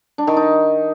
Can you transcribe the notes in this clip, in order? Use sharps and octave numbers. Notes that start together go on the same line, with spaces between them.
D4
D#3
D#4